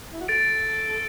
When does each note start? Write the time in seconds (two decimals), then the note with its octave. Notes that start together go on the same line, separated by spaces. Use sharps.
0.13 E4
0.21 F#4
0.28 A4 A6 D7